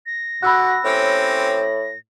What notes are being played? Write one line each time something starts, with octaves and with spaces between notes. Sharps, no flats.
A#6
D3 F#4 B5 E6 F#6
A2 C4 C#4 G4